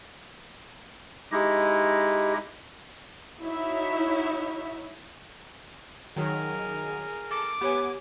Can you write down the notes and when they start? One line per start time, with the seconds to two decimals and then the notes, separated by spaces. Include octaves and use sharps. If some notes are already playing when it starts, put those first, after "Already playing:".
1.32 G#3 D#4 E4 G4 D#5
3.43 D#4 E4 F#4 C#5 E5
6.16 D#3 F#3 G#4 A#4
7.31 A4 D6
7.61 B3 G4 C#5 G#5